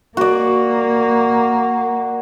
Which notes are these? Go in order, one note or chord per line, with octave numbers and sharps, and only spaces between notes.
A#3 F#4 D5